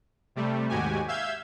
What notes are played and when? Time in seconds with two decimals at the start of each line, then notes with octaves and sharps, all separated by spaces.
0.36 C3 G3 A3
0.69 D#2 G#2 F#4 G4 G#5
1.08 E5 F5 E6 G6 G#6